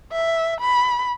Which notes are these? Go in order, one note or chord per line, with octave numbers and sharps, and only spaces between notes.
E5
B5